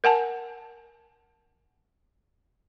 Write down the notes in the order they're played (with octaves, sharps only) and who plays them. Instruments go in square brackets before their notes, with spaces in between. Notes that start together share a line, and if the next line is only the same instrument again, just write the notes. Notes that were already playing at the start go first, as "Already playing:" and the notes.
[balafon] A#4 F#5 G#5 A5